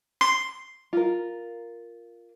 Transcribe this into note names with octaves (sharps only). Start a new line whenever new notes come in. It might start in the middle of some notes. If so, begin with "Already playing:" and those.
C6
F4 A#4